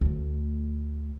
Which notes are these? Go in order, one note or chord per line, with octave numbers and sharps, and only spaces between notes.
D2 A3